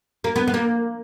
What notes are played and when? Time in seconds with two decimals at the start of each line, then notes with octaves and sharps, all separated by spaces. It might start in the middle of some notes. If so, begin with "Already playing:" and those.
0.24 A#3
0.36 B3
0.48 B3
0.54 A#3